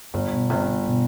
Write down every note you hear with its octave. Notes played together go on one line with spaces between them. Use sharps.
G1 G2
B2
G1 C3
C3
B2